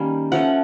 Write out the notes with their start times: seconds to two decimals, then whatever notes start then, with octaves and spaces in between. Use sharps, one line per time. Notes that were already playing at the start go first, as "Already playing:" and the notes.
Already playing: D#3 G3 A#3 C#4
0.32 F3 A3 C#4 F#5